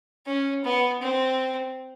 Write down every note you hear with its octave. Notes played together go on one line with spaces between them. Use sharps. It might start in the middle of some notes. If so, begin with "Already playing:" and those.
C#4
B3
C4